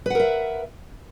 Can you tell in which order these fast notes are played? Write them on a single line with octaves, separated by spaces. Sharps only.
B4 F#5 A#4 E5